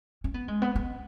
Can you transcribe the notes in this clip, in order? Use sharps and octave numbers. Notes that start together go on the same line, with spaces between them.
C#4
B3
G#3
B3
B3